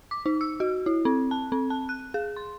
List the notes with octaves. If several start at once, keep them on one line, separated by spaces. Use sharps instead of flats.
D6
D#4
E6
F#4
E4
C4
A5
C4
A5
F#6
G#4
C6